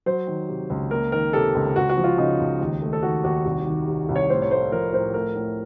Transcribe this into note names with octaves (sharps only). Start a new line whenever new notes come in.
F#3 C5
D#3
C3
C#2
A#3 A#4
D#3 A#4
C3 A4
C#2
C#2 F#4
F#4
F3
F4
C#3 D#4
C#2
D#2
A3
A4
D#3 F#4
D#2 F#4
C2
D#3
C3
C2
C#5
A2 C5
C#5
A3 C5
F3 A#4
A2 C5
A3 A#4
A2